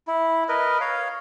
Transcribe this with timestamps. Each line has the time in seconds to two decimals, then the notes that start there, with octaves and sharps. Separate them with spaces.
0.08 E4
0.49 A#4 B4 D#5
0.81 C#5 F5